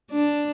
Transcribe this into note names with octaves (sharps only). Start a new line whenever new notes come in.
D4